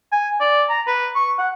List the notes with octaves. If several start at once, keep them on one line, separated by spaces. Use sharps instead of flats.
G#5
D5
A#5
B4
C#6
F#5